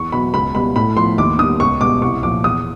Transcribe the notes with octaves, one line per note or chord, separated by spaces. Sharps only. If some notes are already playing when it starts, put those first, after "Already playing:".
Already playing: E2 C#6
B2 F#3 B5
C#2 B5
B2 G3 B5
A2 B5
F3 C6
D#2 D6
D#3 G3 D#6
C#2 C#6
B2 G3 D6
C2 C#6
A#2 F3 D6
E2 D#6